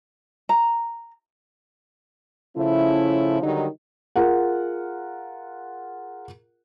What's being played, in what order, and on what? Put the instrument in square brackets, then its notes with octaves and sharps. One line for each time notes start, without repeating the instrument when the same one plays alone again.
[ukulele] A#5
[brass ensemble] C#3 F3 A3 C#4 E4
D3 D#3 F#3 G3 D#4
[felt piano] F4 G#4 A#4 F#5